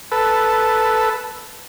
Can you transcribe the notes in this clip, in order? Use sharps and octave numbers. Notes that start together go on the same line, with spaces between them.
A4 B4